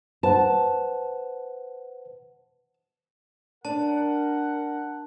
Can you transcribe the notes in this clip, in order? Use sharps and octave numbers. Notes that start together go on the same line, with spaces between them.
B4 C5 F#5 A5
D4 A#4 F#5 A5